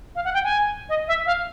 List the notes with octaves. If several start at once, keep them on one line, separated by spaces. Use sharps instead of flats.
F5
F#5
G5
G#5
D#5
E5
F5